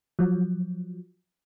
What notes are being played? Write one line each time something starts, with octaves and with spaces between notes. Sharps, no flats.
F3 F#3